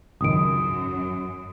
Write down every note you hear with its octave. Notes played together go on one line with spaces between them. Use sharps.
G#1 C#2 F#2 D#3 D#6 D7